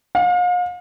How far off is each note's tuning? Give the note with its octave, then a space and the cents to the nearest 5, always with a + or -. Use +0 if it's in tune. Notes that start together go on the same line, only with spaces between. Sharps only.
F5 +40